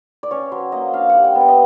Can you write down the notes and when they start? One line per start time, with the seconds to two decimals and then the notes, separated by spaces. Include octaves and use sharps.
0.23 D5
0.31 C#4 C#5
0.52 F#3 C5
0.72 A#3 D#5
0.93 D4 F5
1.09 G3 F#5
1.24 G5
1.35 B3
1.41 F#5
1.48 D#5